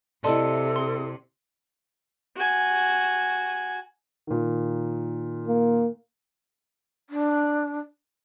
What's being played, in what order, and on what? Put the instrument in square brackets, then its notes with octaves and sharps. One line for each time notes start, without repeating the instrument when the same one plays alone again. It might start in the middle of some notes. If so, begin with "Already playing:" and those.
[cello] C3 [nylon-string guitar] E4 D#5 [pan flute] A4 [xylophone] D5 A5 C6
[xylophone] C6
[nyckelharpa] F#4 G#5
[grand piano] A#2 D#3
[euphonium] A#3
[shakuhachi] D4